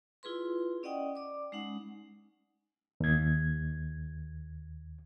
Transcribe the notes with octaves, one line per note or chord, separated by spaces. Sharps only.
E4 F4 G#4 B4 C6
C#4 D5 D#5 F#5 G5 D#6
D5 D6
G#3 C#4 D#4 F#5
D#2 G#6